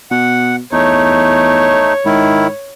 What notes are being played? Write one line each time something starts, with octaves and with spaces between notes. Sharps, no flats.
B2 F#5
E2 A3 D#4 C#5
G#2 D#3 E4